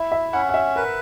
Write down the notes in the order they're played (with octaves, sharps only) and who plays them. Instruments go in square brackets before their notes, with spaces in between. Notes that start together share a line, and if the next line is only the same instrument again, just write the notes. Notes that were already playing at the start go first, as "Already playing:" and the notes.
Already playing: [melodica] E4 [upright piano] E5
[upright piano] E5
[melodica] C#4 [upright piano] F#5
[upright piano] F#5
E5
[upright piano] A#4 [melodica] B4